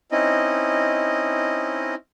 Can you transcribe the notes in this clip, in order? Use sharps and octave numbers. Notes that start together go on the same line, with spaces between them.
C4 C#4 D#4 E4 D#5